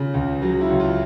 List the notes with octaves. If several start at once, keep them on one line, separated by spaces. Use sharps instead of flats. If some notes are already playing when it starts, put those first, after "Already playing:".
Already playing: C#3 F4
C#2
F#3
E4
C#2
F4